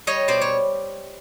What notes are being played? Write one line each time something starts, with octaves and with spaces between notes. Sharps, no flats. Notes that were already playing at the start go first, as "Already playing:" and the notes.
G3 C#5 D#5
B2 C5 D5
C#5